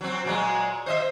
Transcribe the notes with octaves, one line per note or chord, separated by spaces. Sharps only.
F#3 C4
A#2 F#3 G#3
C5 D#5 E5